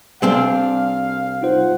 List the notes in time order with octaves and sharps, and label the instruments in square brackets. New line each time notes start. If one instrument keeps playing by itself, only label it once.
[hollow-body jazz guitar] C2 C4 D4 [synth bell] G3 [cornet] F5
[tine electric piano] D#4 F4 C5 [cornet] F#5